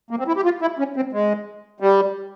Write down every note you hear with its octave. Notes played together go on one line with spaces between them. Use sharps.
A#3
C4
E4
G4
F4
E4
C#4
C4
G#3
G3